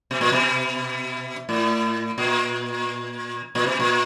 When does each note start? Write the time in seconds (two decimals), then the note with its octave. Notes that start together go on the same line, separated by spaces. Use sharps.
0.11 B2
0.21 A#2
0.32 B2
1.49 A2
2.18 A#2
3.55 A#2
3.67 B2
3.80 A#2